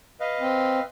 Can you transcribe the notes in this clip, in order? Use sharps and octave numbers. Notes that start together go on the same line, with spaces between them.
B4 D#5 F5
C4